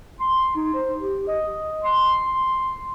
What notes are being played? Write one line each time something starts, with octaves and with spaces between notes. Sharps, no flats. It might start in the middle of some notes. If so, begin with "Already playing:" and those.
C6
D#4
C5
G4
D#5
C6
C6